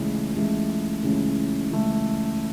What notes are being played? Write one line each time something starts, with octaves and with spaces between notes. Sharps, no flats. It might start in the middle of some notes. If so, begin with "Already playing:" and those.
Already playing: C#2 C#3 E3 A3
C#2 C#3 E3 A3
C#2 C#3 E3 A3
C#2 C#3 E3 A3